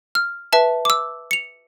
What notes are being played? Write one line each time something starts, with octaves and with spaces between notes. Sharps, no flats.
F6
B4 E5 A5
D6 E6
C#7 F7